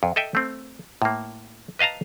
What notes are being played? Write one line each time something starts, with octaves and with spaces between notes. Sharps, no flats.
F2
A4 D#5 E5 G5
A3 C4
A2 A#3
B4 D#5 F5 A5 A#5